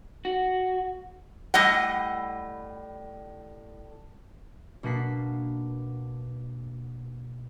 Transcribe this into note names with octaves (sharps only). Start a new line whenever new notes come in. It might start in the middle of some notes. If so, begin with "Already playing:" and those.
F#4
A2 G3 D#5 F#5
B2 A#3 D4 F#5 B6 C7